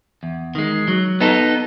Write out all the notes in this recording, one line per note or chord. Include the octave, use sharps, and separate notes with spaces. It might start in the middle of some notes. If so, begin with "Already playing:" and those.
E2
D#3 G#3
F#3
B3 D#4 A4